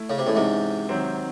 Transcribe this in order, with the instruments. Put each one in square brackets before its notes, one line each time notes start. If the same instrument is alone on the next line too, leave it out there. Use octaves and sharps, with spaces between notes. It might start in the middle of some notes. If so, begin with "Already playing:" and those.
Already playing: [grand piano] A3 E4
[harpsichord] C#3
C3
[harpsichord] A2 [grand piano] E3 G#3 C#4
[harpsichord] G#2 C3
[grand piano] D#3 F#3 C4